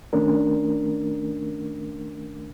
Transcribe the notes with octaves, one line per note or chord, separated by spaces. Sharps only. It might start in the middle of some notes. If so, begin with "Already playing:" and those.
D#3 A3 C#4 D4 A#4